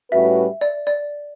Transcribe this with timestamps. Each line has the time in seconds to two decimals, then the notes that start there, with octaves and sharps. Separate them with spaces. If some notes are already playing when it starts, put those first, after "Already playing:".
0.11 A2 G3 C#4 F#4 B4 E5
0.61 D5
0.87 D5